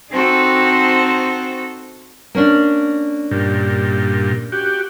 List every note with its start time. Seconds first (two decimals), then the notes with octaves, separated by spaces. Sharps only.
0.12 C4 D#4 F#4 A4 C5
2.35 A#3 C#4 D4
3.31 G2 A#2
4.52 F#4 G4